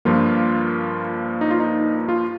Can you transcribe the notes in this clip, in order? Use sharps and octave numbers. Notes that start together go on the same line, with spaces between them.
G2 F3 A#3 F4
D#4
F4
D#4
F4